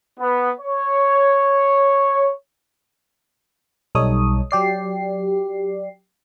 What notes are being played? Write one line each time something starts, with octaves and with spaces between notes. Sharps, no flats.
B3
C#5
B1 G3 D#4 A4 C#5 D#6
F#3 G4 D5 C7